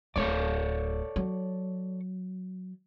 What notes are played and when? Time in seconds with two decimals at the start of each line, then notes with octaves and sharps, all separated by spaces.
0.16 D1 A3 A4 C#5 D5
1.16 F#3